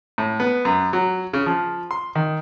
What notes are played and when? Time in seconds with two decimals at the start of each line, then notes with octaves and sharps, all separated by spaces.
0.18 A2
0.40 B3
0.65 F#2
0.93 F#3
1.33 C#3
1.46 F3
1.91 C6
2.15 D#3